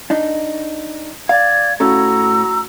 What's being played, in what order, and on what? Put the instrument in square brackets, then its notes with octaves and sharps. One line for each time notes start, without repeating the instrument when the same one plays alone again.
[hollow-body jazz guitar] D4 D#4
[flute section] D5 G#6 [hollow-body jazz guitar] F5
[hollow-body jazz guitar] A2 C#4 A4 [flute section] F#4 A#5 E6